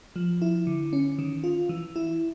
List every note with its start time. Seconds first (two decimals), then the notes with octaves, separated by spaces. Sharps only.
0.16 F3
0.42 E4
0.67 D3
0.93 C#4
1.19 D#3
1.44 F4
1.69 E3
1.96 E4